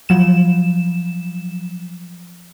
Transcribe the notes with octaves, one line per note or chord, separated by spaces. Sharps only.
F3 F#3 E7